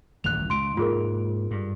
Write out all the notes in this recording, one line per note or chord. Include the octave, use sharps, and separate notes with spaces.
D#1 A1 F#2 F#6 F7
C#2 C6 D7
G#2 A#3 F4 G#4 A#4
G2